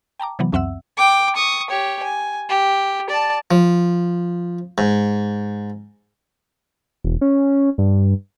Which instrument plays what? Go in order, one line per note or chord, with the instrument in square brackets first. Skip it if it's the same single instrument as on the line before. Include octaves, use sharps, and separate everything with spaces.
[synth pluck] G5 A5 A#5 D6
C3 E3 F#3 B3
C#2 F#2 C4 E5 F#5 E6
[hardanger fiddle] G5 D6
C#6 D#6
G4 C#5
G#5
G4
D5 A5
[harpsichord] F3
G#2
[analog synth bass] E1
C#4
G2